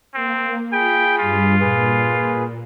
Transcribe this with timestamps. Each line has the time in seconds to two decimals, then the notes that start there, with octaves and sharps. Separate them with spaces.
0.14 A#3 C4
0.73 F4 G#4 G5 B5 B6
1.18 G2 G3 F4
1.60 A#2 G#4 B4